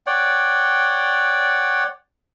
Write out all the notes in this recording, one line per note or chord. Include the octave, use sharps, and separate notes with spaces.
C#5 D5 F#5 G5